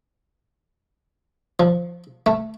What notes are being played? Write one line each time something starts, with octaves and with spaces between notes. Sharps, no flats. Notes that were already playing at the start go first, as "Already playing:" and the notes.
F3
A3